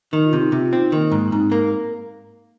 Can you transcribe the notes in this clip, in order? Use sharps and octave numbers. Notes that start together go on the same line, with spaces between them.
D#3 D#4
F4
C3 D#4
C3 F4
F4
C4 D#4
D#3 A#3
G#2 A#3
D#4
G#2 C4
A#3 D#4